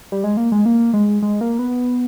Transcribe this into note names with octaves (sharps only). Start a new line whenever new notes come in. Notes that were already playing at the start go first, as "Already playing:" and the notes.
G3
G#3
A#3
G#3
A#3
G#3
G#3
A#3
B3